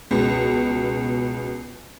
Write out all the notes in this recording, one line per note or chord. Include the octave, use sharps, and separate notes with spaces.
C#2 B2